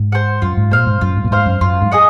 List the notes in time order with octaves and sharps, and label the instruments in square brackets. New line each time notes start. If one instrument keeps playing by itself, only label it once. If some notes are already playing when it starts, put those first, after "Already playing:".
Already playing: [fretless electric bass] G#2
[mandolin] C5 F#5
[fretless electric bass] F#2 [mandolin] F4
[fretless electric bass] G#2
[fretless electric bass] A#2 [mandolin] C5 F5
[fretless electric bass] G#2
[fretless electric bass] F#2 [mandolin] F4
[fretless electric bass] G#2
A#2
[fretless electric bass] G#2 [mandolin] C5 F5
[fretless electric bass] F#2
[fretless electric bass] F#2 [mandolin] F4
[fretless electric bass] G#2
[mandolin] G#4 D#5 F#5